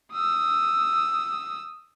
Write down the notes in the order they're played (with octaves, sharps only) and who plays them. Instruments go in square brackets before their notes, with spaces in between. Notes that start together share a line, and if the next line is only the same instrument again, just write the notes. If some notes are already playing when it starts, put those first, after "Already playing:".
[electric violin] D#6 E6